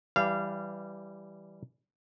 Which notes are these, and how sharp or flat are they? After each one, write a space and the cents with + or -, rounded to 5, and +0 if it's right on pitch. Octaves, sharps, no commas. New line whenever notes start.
E3 +15 G3 +0 F5 -25